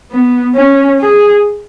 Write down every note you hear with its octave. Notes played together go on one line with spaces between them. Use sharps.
B3
C#4
G#4